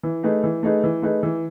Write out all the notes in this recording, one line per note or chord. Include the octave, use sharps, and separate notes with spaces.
E3
A3 D#4 G#4 B4
E3
A3 D#4 G#4 B4
E3
A3 D#4 G#4 B4
E3